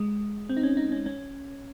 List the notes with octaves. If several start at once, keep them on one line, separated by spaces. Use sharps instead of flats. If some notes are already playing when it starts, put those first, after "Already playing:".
Already playing: G#3
C4
D#4
C#4
D#4
C#4
C#4